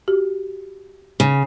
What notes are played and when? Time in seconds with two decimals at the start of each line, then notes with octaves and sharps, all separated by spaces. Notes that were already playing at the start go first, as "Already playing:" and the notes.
0.08 F#4 G4
1.20 C#3